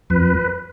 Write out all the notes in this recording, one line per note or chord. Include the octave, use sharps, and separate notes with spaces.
F2 B4